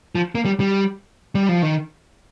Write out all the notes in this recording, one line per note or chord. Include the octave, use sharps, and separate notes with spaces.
F3
A#3
G3
G3
G3
F3
D#3